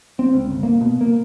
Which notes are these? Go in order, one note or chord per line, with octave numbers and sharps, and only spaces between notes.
C4
C#2
G1
A#3
B2
A#3